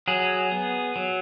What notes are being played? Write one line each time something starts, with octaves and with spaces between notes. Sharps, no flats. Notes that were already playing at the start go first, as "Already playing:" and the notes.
F#3 G#4
B3
F#3